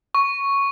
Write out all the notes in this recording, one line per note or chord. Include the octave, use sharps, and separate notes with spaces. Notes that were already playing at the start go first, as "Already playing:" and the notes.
C#6